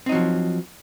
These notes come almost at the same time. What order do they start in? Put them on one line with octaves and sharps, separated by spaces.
C4 D#4 F#3 F3